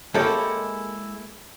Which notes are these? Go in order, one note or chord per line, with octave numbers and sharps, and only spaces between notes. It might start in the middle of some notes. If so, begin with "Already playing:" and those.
G#3 A#3 E4 G4 A4 C#5